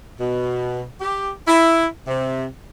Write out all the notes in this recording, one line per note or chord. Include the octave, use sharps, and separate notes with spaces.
B2
G4
E4
C3